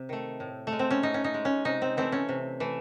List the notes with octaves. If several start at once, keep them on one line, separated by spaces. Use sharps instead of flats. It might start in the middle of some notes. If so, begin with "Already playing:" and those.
Already playing: C3
D#3 A3
A2
A3
G#3
C4
C#4
A2 D#4
C#4
D#4
G#3
C#4
C3 D#4
C4
E3 A3 C4
C#4
C3
E3 A3